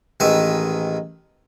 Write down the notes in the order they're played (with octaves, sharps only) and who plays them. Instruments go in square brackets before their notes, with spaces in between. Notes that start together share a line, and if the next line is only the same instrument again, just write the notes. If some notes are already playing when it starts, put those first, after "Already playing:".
[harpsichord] A1 D#3 G#3 B4 E5